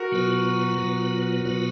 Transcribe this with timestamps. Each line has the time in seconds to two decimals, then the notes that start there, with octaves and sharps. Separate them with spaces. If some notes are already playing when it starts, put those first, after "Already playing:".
Already playing: F#4 A#4
0.12 B2 F#3 B3 F4 B4
0.77 B2 F#3 B3 F4 B4
1.45 B2 F#3 B3 F4 B4